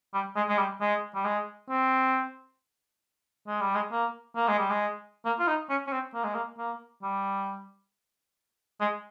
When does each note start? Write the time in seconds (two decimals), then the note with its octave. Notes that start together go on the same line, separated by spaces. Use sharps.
0.14 G3
0.36 G#3
0.49 G#3
0.58 G3
0.81 G#3
1.15 G3
1.25 G#3
1.70 C4
3.47 G#3
3.61 G3
3.75 G#3
3.91 A#3
4.36 A#3
4.48 G#3
4.59 G3
4.70 G#3
5.25 A#3
5.39 F4
5.47 D#4
5.70 C#4
5.87 C#4
5.92 C4
6.14 A#3
6.24 G#3
6.34 A#3
6.58 A#3
7.03 G3
8.80 G#3